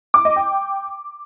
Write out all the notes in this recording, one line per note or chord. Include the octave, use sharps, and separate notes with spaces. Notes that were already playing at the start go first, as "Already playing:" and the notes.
D6
D#5
G5